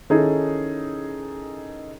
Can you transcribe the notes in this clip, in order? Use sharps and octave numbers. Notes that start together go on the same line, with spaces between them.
D#3 C#4 D#4 E4 G#4 A4